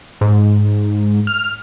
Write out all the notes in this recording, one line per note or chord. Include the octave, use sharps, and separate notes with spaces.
G#2
F6